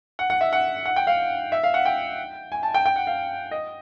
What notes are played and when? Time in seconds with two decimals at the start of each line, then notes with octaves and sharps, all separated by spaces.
0.19 F#5
0.30 F#5
0.41 E5
0.53 F#5
0.85 F#5
0.96 G5
1.07 F5
1.52 E5
1.63 F5
1.74 F#5
1.86 G5
2.52 G#5
2.63 A5
2.74 G5
2.86 G5
2.96 F#5
3.07 F5
3.51 D#5